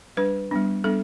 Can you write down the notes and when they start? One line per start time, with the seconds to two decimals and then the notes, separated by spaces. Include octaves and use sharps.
0.17 G3 D4 B4
0.51 G3 B3 D4
0.84 G3 B3 D4 A4